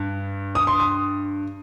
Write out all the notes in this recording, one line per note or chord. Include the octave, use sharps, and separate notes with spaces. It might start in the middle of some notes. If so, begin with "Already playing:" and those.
Already playing: G2
D#6
C6
D#6